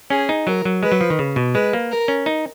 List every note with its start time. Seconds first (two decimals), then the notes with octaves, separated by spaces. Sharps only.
0.10 C#4 G#4
0.29 D#4
0.47 F#3 A#4
0.65 F#3
0.83 G#3 B4
0.92 F#3
1.01 F3
1.10 D#3
1.19 C#3
1.36 B2
1.54 G#3 B4
1.73 A#3
1.91 A#4
2.08 C#4
2.26 D#4